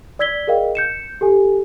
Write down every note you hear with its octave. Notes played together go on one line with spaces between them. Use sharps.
D5 E6 G#6 B6 G7
G#4 A#4 D#5 F5 G5
G6 C#7 E7
G4 A4 G#5